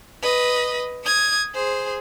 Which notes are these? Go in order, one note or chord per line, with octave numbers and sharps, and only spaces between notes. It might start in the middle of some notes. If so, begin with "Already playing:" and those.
B4 D#5
D#6 G#6
G#4 C5